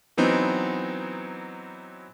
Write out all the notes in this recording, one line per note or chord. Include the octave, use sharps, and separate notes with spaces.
E3 F#3 B3 C4 D#4